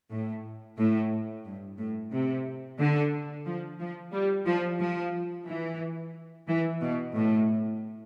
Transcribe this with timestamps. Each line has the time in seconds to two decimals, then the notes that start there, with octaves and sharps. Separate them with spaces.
0.11 A2
0.77 A2
1.45 G2
1.78 A2
2.12 C3
2.79 D3
3.46 F3
3.80 F3
4.12 G3
4.46 F3
4.80 F3
5.47 E3
6.47 E3
6.81 B2
7.15 A2